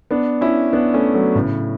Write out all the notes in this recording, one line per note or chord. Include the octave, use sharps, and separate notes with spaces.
B3 D4
C#4 E4
B3 D4
A3 C#4
F#3 A3
A2 C#3